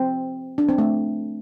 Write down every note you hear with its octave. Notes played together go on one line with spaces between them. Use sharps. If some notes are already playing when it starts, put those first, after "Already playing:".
Already playing: C4
D4
C4
A3